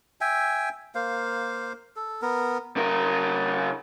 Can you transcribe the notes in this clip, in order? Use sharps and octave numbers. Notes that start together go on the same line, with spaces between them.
E5 G5 G#5
A#3 C5 F5
A4
B3 A#4
C#3 A#4